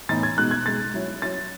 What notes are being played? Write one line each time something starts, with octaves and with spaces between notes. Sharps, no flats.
A2 E3 B3 D#4 A6
G#6
B2 G#3 D#4 F#6
G#6
B2 G#3 D#4 A6
F#3 C#4 E4
F#3 C#4 E4 A6